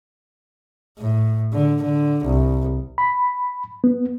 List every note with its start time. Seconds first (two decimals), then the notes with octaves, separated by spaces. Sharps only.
0.99 A2
1.53 D3
1.83 D3
2.25 C2
2.98 B5
3.84 B3